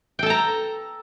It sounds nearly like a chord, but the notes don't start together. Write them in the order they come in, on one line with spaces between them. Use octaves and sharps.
G5 A4 A5 A#5